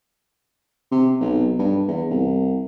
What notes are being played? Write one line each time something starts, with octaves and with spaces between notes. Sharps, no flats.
C3
B1
G2
E2
C2